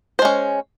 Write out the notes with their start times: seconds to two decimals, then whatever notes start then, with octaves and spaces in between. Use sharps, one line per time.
0.19 C5
0.22 G#3
0.25 C#4